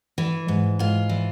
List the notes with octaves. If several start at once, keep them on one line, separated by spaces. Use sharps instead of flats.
E3
G#2
G#2 F4
E3